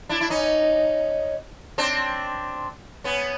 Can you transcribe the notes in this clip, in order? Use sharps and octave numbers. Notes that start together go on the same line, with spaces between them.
D4 E4
E4
C#4 D#4
C4 D4
B3 C#4